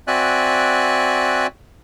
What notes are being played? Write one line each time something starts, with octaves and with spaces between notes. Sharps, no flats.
C4 F#4 D5 E5 G#5 F#6